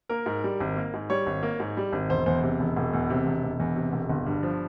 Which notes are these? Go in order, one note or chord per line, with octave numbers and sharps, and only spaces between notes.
A#3 A#4
G#2
G3
G#1
A#3
G#2
G3 C#5
G#1
A#3
G#2
G3
G#1
E1 C5
E2 C5
C3
E1
E1
E2
C3
E1
E1
E2
C3
E1
G1
G2
F3